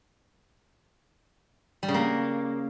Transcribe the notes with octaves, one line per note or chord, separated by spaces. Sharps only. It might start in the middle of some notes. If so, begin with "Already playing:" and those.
G3
C#3
A#3